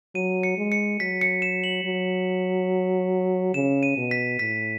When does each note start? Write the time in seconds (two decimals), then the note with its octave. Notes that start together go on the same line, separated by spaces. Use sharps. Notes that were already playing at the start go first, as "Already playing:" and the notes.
0.15 F#3 D#7
0.43 C#7
0.58 G#3
0.72 C#7
1.00 F#3 B6
1.21 C#7
1.42 E7
1.64 F#7
1.84 F#3
3.54 C#3 E7
3.83 D#7
3.97 B2
4.11 B6
4.39 A2 B6